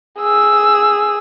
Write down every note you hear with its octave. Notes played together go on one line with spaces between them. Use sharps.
G#4 E6